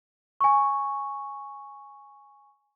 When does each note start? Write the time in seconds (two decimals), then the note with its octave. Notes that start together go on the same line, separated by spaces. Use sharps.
0.41 G#5 C#6